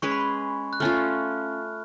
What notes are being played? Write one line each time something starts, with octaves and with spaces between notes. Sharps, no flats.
G#3 C#4 G#4 B4 C#6
B5
C#6
F#6
A3 C#4 F4 F6